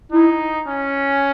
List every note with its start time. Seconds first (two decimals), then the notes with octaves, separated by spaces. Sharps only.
0.12 D#4 E4
0.68 C#4